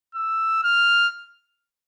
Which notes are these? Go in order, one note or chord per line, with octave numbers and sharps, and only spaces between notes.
E6
F6